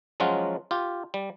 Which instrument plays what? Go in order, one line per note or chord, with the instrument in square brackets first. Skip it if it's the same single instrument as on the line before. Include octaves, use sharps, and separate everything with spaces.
[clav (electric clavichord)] F3 F#3 G#3 C#4 F4 F#4
F4 G4
G3